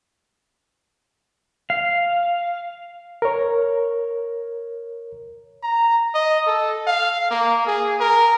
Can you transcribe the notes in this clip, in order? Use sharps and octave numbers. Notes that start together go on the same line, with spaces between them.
F5
A#4 C#5
A#5
D#5
A4
F5
A#3
G#4
A#4